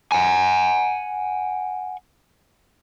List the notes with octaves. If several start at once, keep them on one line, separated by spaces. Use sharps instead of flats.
F#5 G#5